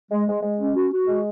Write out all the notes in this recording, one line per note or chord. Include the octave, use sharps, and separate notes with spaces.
G#3
G#3
G#3
C#4
F#4
F#4
G#3